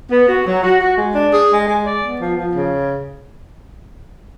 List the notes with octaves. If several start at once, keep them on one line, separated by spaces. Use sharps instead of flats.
B3
F#4
F#3
F#4
F#4
G#3
D4
G#4
G#3
G#3
D5
B3
F3
F3
C#3